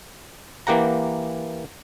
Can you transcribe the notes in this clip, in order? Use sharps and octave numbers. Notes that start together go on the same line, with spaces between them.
E3 A#3 G4 F#5 A#5